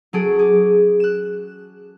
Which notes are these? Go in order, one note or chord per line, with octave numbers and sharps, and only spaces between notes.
F#3 C#4 G#4 A4 D7
G#4 D6
F#6 E7